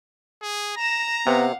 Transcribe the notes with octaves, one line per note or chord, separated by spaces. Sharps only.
G#4
A#5 A#6 E7
C3 B3 F5 F#5